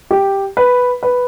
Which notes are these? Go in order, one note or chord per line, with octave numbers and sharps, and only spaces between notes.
G4
B4
B4